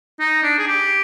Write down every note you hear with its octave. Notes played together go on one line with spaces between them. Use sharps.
D#4
D4
G#4
G4